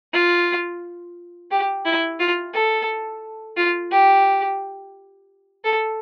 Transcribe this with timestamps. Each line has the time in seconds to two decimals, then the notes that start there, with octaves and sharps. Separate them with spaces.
0.13 F4
1.51 G4
1.85 E4
2.20 F4
2.54 A4
3.57 F4
3.92 G4
5.65 A4